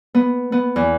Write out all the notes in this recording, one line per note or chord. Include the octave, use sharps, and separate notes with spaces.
B3
B3
E2